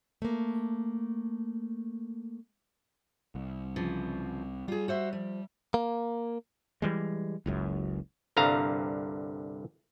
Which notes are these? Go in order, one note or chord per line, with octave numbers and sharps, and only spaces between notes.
A3 A#3
C2
C#3 E3 F3
G3 F4 G#4
F#4 C5 E5
F3
A#3
E3 G3 G#3
F#1 C#2 F#2
C2 G2 D3 F5 A#5